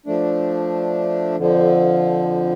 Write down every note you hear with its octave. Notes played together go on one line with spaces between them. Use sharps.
F3 A3 D4
F2 D3 F3